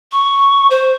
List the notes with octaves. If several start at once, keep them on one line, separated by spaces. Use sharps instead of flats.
C#6
C5